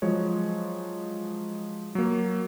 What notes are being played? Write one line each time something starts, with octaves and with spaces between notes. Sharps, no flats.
F3 F#3 G#3 C#5
F#3 A#3